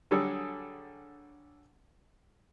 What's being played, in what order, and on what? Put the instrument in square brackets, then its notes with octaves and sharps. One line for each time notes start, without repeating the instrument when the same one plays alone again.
[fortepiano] D3 F#3 G3 G#4 A4